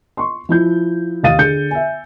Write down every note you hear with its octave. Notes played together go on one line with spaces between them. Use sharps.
C6 C#6
F3 E4 G6
D#2 F5 D#6 A6 D#7
D3 G#4 G6 C#7
E5 G#5